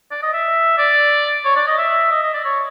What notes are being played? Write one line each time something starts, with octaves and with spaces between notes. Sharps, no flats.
D5
D#5
E5
D5
C#5
D5
D#5
E5
D#5
D#5
D5
C#5